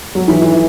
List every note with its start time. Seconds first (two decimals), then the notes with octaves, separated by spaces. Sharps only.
0.15 F#3
0.28 E3
0.42 E3